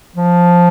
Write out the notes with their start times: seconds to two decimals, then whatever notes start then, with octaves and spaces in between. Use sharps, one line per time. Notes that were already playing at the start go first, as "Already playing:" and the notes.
0.16 F3